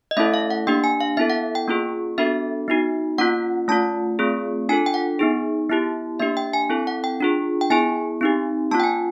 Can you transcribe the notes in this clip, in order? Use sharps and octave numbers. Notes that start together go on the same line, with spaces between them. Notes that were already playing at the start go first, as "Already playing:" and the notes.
D#5
A3 C#4 E4 A4 E5
F5
F#5
A#3 D4 G4 G5
G#5
F5
B3 E4 A4 E5
F#5
G5
A#3 C#4 F4 G#4
B3 D4 F#4 A4 E5
B3 D#4 F#4
A#3 C#4 F4 F#5
A3 C#4 F4 A5
A3 C4 F4 G#4
D4 F4 A4 G#5
G5
F#5
B3 D#4 G#4
B3 E4 G4
A#3 D4 G4 E5
G5
G#5
C4 E4 A4
F#5
G5
D4 F4 G#4
G5
B3 E4 G#4 G#5
C4 D#4 G4
A#3 C#4 F4 A5
G5
G#5